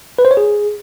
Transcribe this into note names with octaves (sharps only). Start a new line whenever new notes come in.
B4
C5
C#5
G#4